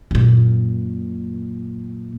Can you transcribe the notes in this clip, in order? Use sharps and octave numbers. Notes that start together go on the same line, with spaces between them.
F#2 A#2